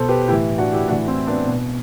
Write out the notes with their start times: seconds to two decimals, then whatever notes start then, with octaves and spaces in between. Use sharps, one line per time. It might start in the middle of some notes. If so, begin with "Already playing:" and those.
Already playing: B2 A4 C5
0.08 G4 B4
0.28 A2 E4 G4
0.32 E3
0.58 D4 F#4
0.72 E4 G4
0.88 A2 D4 F#4
0.92 E3
1.08 C4 E4
1.27 B3 D4
1.48 B2